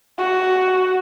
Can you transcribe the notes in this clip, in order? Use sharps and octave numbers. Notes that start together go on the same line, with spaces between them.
F#4